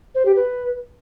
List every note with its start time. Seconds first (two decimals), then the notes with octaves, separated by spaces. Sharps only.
0.15 C5
0.25 G4
0.36 B4